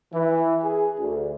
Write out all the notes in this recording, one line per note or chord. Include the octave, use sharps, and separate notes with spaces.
E3
G#4
D2